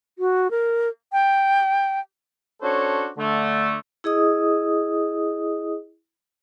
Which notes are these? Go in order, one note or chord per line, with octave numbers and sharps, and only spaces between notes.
F#4
A#4
G5
C#4 D4 F#4 A4 C5 C#5
D3 A3
E4 G#4 D#5 D#6